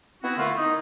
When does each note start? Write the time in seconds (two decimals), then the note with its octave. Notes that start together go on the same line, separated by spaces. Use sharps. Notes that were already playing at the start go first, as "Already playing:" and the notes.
0.23 B3 C4 E4 F#4
0.37 A#2 D3 A3 E4 F4
0.57 D#4